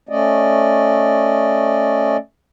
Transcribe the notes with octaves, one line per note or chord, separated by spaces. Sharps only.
A3 C#4 D5 D#5